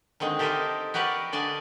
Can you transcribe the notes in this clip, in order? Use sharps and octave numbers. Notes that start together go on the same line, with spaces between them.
D3 D#3 G#3 C4
G4 A4 A#4 C5 D#5 E5
F#4 G4 A#4 B4 D5 F#5
D3 D5 D#5 G#5 A5